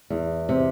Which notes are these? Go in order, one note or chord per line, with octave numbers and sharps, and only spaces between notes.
E2
C3